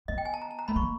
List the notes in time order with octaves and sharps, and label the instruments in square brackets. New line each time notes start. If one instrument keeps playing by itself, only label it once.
[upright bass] B3 [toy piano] D#5
[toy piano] G5
G#5
A5
A#5
A5
A#5
[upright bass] A3 [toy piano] B5
[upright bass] A#3 [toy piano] C#6